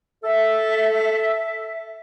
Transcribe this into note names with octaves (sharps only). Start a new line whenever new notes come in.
A4 E5